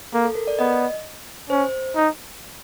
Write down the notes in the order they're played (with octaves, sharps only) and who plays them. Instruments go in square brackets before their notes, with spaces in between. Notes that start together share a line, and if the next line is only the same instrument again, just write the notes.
[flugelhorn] A#3 [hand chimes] A4
[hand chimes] A4
A#4
D5
[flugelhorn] B3 [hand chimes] D#5
[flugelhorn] C#4 [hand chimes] C5
[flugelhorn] D#4